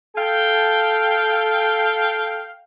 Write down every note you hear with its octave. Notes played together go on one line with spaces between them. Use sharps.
A4 F5 G5